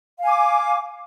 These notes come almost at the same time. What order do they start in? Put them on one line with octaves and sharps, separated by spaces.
F5 G#5 D6